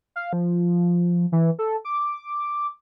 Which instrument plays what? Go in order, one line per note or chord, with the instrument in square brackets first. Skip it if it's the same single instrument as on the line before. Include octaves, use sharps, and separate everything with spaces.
[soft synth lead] F5
F3
E3
A4
D6